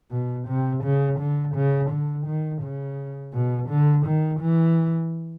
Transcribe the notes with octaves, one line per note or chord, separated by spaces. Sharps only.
B2
C3
C#3
D3
C#3
D3
D#3
C#3
B2
D3
D#3
E3